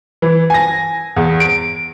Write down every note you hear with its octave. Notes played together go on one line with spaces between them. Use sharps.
E3
G#5 A#6
E2
D7